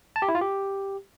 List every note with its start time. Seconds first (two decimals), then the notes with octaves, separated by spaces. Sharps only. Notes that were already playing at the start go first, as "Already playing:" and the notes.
0.16 A5
0.22 G4
0.29 E4
0.35 F4
0.41 G4